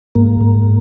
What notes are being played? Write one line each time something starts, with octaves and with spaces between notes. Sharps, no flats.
G#2 A#3
G#2